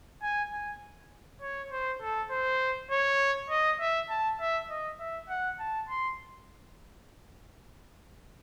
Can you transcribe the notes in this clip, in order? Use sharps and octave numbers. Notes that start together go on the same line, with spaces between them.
G#5
G#5
C#5
C5
A4
C5
C#5
D#5
E5
A5
E5
D#5
E5
F#5
A5
C6